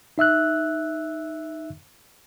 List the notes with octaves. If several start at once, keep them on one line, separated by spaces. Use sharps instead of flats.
D#4 E5 E6 F#6